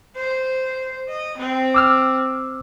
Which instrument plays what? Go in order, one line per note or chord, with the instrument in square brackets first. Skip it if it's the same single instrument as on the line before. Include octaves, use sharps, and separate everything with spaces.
[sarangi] C5
D#5
C4
[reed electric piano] D6 E6 F6